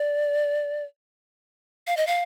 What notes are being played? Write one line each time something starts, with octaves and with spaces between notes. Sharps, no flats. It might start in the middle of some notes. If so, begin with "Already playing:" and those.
Already playing: D5
F5
D#5
F5